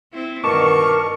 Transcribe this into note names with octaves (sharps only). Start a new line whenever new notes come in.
C4 E4
G2 B2 D#3 A#4 A5 C#6 D6